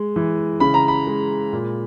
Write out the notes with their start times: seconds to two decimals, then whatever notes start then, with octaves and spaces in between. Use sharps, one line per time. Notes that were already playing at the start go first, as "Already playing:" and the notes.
Already playing: G#3
0.16 E3
0.60 C#3 B5
0.74 A#5
0.88 B5
1.07 G#3
1.53 A#2